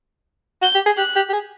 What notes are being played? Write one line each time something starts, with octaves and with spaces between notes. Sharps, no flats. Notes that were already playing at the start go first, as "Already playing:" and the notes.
F#4 G6
G4
G#4
G4 F#6
G4
G4
G#4